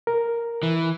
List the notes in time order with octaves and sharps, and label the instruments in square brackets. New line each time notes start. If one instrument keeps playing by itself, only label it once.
[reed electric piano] A#4
[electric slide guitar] E3